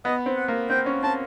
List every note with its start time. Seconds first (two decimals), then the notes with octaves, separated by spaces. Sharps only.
0.05 B3 D#5
0.26 C4
0.37 F#5
0.48 A#3
0.70 C4 G5
0.86 C#4
1.03 C4 A5